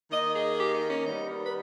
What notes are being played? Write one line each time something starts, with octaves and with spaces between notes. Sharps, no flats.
D#3 A#3 D#5
G#4
G4
D#4
C#4
D#3 G3 B3 D#4
A#4
B4